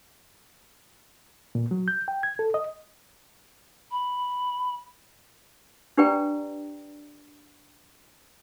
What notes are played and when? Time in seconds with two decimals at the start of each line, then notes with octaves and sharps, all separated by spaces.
1.55 A#2
1.71 F#3
1.88 G6
2.08 G5
2.23 G#6
2.39 A4
2.54 D#5
3.91 B5
5.98 D4 G4 B4 D5 G5 A#5